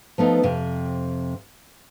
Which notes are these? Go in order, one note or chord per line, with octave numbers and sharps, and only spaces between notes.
F3 A3 B3 D#4
F2 C3